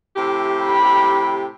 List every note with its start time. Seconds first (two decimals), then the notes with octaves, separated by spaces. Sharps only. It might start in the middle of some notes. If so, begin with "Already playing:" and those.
0.17 A2 C3 G4
0.65 B5